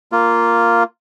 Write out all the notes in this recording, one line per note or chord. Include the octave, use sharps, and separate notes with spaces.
A#3 F4